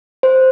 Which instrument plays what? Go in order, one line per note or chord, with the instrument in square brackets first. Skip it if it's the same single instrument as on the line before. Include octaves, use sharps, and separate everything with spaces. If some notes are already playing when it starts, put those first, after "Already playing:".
[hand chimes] C5